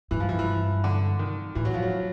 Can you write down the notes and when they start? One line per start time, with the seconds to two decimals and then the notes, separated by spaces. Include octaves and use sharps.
0.11 G2 E3
0.20 F3
0.29 E3
0.39 E3
0.84 D3
1.19 D#3
1.55 A2 E3
1.65 F#3
1.74 F3
1.82 F#3